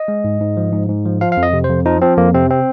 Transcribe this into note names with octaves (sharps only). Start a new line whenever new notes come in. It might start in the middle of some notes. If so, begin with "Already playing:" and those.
Already playing: D#5
G#3
G#2
G#2
F3
G#2
G#2
F3
F3 F5
F5
F2
D#5
C3
C5
F2
F3 D#4
F3 C4
F2 A#3
C3 C4
C4